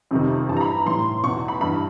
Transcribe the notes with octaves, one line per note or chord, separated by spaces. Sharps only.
F2 C3 D#3
G2 E3 A5
A#5
B5
A2 E3 C6
E2 B2 C#6
B5
G2 E3 B5